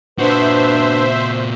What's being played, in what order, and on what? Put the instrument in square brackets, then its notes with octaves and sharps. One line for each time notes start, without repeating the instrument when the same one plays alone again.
[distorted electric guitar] A#2 F#4 [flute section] D4 B4 [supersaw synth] C5 E5